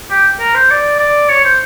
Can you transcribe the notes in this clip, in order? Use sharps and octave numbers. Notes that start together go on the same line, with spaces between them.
G4
A#4
C5
D5
D5
C#5
C5